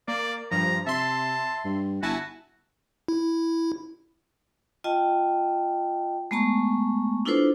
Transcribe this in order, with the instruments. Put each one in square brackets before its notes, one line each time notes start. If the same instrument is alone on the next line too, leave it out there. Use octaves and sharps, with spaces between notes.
[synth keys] A#3 [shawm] D5
[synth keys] G2 F3 [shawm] A#5
[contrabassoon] C3 [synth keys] E5 C6 [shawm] A5
[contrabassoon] G2
[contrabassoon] G1 [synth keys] E4 G#5 A5 [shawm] F#4
[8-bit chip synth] E4
[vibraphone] F4 D#5 G5 A5
G#3 A3 B3 A5 A#5 C#6
D4 E4 F4 A4 B4 C5